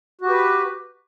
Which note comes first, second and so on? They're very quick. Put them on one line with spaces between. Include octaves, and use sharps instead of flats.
F#4 G4 B4